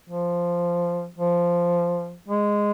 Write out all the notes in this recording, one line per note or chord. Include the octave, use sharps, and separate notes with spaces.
F3
F3
G#3